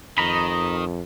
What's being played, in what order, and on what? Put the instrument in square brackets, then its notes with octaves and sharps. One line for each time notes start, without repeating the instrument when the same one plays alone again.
[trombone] F2 [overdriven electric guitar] D#3 [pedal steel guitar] D#5 A#5 B5